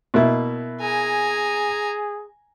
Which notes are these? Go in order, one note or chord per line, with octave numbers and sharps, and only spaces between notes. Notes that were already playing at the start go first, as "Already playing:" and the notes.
B2 A#3 E4
G#4 G#5 A#5